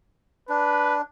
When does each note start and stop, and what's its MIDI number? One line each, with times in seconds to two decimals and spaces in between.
0.49 1.02 62
0.49 0.96 71